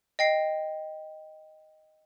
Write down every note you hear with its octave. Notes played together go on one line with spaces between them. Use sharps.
D#5 G5 C7